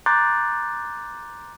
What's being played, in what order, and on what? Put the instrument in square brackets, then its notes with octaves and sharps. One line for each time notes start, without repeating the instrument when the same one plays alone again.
[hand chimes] A#5 C6 D6 F#6 G6 A6